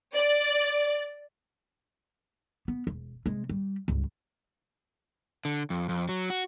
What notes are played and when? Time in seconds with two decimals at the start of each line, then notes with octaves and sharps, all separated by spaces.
0.16 D5
2.68 B3
2.87 E1
3.26 C3 G#3
3.49 G3
3.88 C#2 G2
5.45 D3
5.70 F2
5.89 F2
6.09 F#3
6.30 F#4